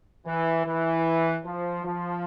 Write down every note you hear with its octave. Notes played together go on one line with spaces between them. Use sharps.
E3
E3
F3
F3